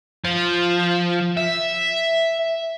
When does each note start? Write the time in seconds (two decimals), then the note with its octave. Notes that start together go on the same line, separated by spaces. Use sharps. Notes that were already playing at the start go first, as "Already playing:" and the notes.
0.24 F3
1.37 E5